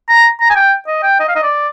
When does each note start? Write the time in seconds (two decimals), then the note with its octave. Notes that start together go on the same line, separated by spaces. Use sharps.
0.09 A#5
0.41 A#5
0.50 G#5
0.56 G5
0.87 D#5
1.03 G5
1.20 D#5
1.28 F5
1.35 D#5
1.43 D5